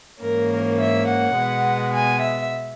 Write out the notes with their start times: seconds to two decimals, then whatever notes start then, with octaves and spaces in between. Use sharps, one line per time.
0.21 G#2 E3 A#3 C#4 A#4
0.50 A#4
0.78 E5
1.06 F#5
1.35 B2 G#3 B3
1.92 G#5
2.21 E5